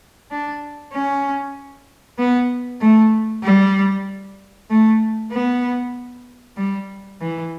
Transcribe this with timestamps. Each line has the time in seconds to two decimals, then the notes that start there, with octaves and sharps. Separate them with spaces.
0.31 D4
0.93 C#4
2.18 B3
2.81 A3
3.43 G3
4.70 A3
5.32 B3
6.57 G3
7.21 E3